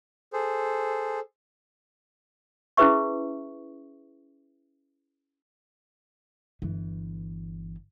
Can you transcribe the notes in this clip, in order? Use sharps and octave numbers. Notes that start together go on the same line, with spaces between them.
G#4 A4 C5
C#4 E4 G#4 B4 E5 C#6
G1 E3